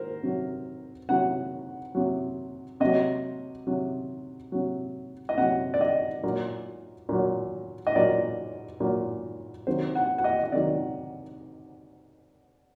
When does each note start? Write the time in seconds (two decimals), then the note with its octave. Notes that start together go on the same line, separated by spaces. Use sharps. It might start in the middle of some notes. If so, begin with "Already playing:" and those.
Already playing: A#4 C5
0.23 C3 F#3
1.09 C3 F#3 F#5
1.95 C3 F#3
2.80 C3 F#3 D#5
3.67 C3 F#3
4.52 C3 F#3
5.29 D#5
5.37 C3 F#3 F#5
5.74 D5
5.81 D#5
6.23 A#2 F#3
7.09 A#2 F#3
7.87 D#5
7.96 A#2 F#3 D5
8.80 A#2 F#3
9.67 C3 D#3 F#3 C5
9.95 F#5
10.18 F#5
10.24 D#5
10.44 D#5
10.52 C3 D#3 F#3 D5